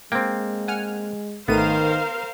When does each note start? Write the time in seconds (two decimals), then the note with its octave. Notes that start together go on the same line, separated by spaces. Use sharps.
0.12 G#3 A#3 C4 G5
0.68 F#5 G#5 F6
1.48 G#1 D#3 A3 B3 A#4 C5 F5 D#7